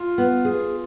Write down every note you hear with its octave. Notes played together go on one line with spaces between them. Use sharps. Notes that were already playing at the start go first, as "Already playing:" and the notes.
Already playing: F4
B3
G#4